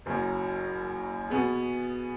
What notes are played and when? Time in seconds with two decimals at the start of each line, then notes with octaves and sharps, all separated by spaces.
0.06 F#1 F#2 F#3
1.30 B2 B3 G#4